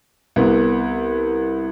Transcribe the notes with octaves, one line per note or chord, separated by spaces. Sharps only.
C2 B3